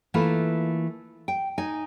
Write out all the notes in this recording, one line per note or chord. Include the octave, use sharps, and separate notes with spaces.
E3 A3 A#3 F4 B4
G5
D#4 G#5